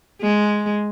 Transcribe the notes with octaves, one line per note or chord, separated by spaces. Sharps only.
G#3